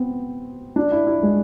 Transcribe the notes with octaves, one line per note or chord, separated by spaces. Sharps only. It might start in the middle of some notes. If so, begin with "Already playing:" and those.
Already playing: B3 C4
D4
E4
E4
G#3